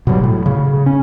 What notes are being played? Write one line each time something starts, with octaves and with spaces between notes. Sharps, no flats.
B2 F#3 G3
A2
C#3
C#4